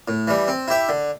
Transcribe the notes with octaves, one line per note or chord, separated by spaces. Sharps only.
A2
E3 G3
C4
E4 G4 E5
D3